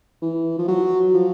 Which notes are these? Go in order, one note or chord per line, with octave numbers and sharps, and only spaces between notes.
E3
F3
F#3
F3